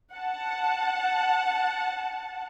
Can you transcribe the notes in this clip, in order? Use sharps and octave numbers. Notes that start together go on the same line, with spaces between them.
F#5 A5